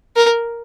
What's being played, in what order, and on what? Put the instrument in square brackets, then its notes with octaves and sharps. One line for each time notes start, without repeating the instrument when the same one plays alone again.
[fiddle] A#4